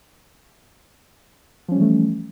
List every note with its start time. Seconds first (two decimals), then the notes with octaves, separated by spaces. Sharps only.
1.68 F3
1.72 C#4
1.75 G3
1.78 E3
1.81 A3